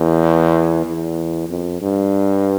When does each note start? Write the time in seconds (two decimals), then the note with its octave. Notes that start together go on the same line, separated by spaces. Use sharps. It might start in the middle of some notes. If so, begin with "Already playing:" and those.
Already playing: E2
0.85 E2
1.49 F2
1.82 G2